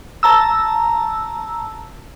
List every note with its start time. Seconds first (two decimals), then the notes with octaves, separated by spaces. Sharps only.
0.23 A5 A#5 E6